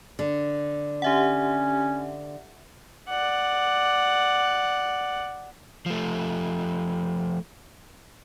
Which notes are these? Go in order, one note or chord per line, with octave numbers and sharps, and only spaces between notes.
D3
C#4 G4 E5 F#5
D5 F#5
F3 A3